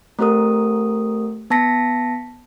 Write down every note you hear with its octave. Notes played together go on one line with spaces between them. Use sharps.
A3 C4 G4 A#4 D#6
B3 A5 A#6 B6 C#7